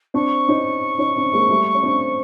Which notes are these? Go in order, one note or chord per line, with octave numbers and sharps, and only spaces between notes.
C4 D4 C#6
C#4 D#4
C#4 D#4
C4 D4
G#3 A#3
G3 A3
C#4
C4 D4